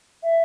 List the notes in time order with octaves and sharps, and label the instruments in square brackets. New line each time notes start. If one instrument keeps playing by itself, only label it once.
[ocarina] E5